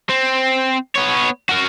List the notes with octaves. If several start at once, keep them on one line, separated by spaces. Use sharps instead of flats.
C4
B3 C#5
F#4 A#4